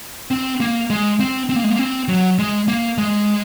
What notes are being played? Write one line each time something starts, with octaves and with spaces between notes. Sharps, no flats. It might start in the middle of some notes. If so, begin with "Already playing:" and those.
C4
A#3
G#3
C4
C4
A#3
G#3
A#3
C4
F#3
G#3
A#3
G#3